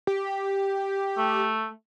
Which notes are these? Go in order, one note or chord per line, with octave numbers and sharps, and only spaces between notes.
G4
A3